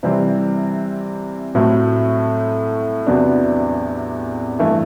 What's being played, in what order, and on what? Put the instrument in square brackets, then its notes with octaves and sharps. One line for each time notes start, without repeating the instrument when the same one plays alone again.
[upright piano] C3 E3 G3 C4
A2 F#3 A3 C4
E2 C3 F#3 B3 D4
G2 E3 A3 E4